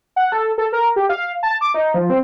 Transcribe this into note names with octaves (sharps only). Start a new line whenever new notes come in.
F#5
A4
A4
A#4
G4
F5
A5
D6
D#4
F3
C4